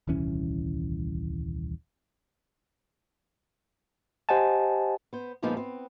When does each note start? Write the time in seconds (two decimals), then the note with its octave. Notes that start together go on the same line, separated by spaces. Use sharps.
0.07 D#1 C2 E3 C#4
4.29 G4 C5 D#5 F#5 G#5 A5
5.13 B3 C5
5.42 F2 A#2 F3 G#3 B3 D#4
5.57 B3 C4